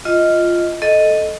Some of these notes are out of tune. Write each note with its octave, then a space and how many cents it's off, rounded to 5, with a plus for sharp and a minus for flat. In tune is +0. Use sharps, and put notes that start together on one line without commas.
F4 -5 D#5 +10
A4 +0 D#5 +0